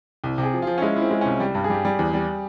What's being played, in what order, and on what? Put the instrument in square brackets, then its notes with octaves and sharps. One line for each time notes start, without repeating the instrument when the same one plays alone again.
[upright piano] C2
C3
[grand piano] G#4
[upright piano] F3
[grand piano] F4
[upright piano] F3
[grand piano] C#4
[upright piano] G#3 [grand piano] E4
[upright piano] E4
[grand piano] C4
[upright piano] G#3
[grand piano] C#4
[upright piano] C2
G3
G2
[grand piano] G#4
[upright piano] G3 [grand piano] G4
[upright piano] G3
E2
G3